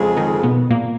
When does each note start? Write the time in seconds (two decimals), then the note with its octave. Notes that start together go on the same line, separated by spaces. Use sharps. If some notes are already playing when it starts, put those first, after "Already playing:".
Already playing: F2 C#3 G#3
0.17 D#3 D#4
0.43 B2 B3
0.70 A#2 A#3